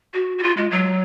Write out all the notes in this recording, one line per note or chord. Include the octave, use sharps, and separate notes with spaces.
F#4
F#4
F4
G#3
F#3